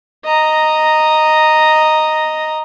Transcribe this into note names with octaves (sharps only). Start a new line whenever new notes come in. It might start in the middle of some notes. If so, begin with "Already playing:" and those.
D#5 A#5